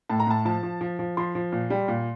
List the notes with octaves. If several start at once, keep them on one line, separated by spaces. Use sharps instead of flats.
A2 A5
A#5
A2 A5
F3 A5
F3
F3
F3
F3 C6
F3
A#2
G3
A#2